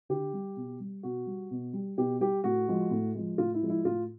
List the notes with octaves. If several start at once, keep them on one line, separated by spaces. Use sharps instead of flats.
D3 G4
G3
B2
G3
B2 F#4
G3
B2
G3
B2 G4
G3 G4
A2 F#4
F3 G#3
A2
F3 G#3
A2 F4
E4
F3 G#3
E4
A2 F4